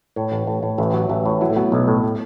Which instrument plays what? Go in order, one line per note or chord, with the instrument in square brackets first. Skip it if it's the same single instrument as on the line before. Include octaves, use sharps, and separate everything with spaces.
[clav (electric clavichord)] A2 [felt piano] C#5
[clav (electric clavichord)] A1
A2
A2
[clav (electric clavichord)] A1 [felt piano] E5
[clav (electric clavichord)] F#3
[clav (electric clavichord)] A1 [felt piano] E5
[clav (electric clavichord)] A2 [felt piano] C#5
[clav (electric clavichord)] F#3 [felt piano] E4
[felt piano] A3
[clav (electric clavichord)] F#3 [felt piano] B3
[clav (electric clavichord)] B1 [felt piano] A3
[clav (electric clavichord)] A2
[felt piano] A3